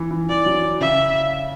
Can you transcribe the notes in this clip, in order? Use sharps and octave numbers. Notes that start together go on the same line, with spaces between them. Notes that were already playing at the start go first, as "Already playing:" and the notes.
Already playing: E3
E3
E3 D5
F#3
C#3 E5